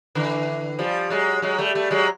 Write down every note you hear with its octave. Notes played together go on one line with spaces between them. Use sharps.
D3 E3
F3 G3
F#3 G#3
F#3 G#3
G3 A3
G3 A3
F#3 G#3